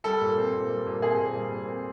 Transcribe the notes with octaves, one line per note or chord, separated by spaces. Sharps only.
G3 A4
A#2
C4
A#2
G3
A#2
C4 G#4
A#2
G3
A#2
C4